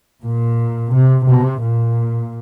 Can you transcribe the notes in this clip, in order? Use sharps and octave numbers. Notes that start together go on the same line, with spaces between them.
A#2
C3
C3
A#2